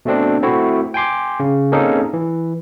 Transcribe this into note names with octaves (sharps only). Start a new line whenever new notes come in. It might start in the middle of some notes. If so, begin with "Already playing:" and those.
B2 A3 C4 D4
A3 C4 E4 F#4
G5 G#5 C6 D6
C#3
A#3 C4 C#4 D#4 G#4 A4
E3